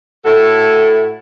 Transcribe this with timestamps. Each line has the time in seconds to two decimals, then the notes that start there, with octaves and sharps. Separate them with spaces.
0.24 A2 E4 F#4 A4